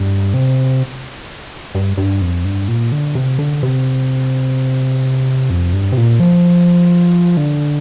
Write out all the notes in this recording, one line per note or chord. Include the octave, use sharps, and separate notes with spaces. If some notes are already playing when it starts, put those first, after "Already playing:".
Already playing: G2
C3
G2
G2
F2
G2
A#2
D3
C3
D3
C3
F2
G2
C3
A#2
F3
D3